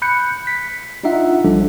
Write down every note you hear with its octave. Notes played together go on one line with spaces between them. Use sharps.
B5 F#6 G6 C#7
B6
D4 D#4 F4 E5 F#5
A#1 F3 G3 D4 A4 C5